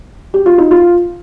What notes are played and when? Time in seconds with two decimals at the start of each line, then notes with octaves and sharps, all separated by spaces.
0.34 G4
0.46 F4
0.58 D#4
0.71 F4